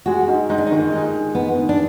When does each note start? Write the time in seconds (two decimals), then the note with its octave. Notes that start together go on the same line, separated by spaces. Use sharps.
0.06 G#3 F#4
0.28 G#2
0.49 G#2 D#4
0.58 D4
0.66 D#4
0.71 D#3
0.92 G#3 D#4
1.14 G#2
1.35 G#2 B3
1.56 D#3
1.69 D4